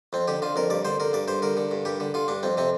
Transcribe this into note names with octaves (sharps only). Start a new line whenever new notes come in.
F2 C4
D3 G4
D3 F4
F2 A#4
G2 D5
D3 C5
D3 A#4
G2 D5
G2 C5
D3 A#4
D3
G2
G2 G4
D3
D3 F4
G2 D4
F2 C4
C3 C4